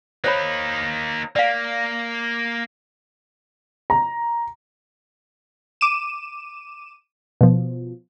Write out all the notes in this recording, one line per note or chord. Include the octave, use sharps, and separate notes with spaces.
A#3 D#4 C5 C#5 B5
A#3 D5 F5
A#5
D6 D#7 E7
B2 F3